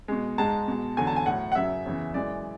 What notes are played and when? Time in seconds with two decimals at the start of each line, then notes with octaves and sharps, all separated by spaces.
0.08 B2 G#3
0.38 G#2 G#3 A5
0.68 B2 G#3
0.97 E2 D3 F#3 G#5
1.07 A5
1.16 G#5
1.26 A2 F#3 F#5
1.52 F#5
1.55 F#2 C#3 F#3 E5
1.86 E2 C#3 E3
2.14 F#2 E3 G#3 D5